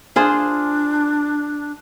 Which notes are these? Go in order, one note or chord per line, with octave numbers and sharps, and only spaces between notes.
D4 F4 G#4 C5